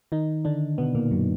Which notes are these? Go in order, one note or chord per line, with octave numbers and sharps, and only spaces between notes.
D#3 D#4
D3 D4
B2 B3
A#2 A#3
F#2 F#3